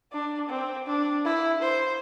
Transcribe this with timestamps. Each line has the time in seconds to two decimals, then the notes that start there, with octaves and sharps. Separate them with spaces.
0.12 D4
0.50 C4
0.87 D4
1.25 E4
1.62 C5